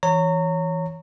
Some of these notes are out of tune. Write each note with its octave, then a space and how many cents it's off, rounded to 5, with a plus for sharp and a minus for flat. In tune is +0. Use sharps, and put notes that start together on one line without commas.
E3 +0 C#5 +0 A#5 -30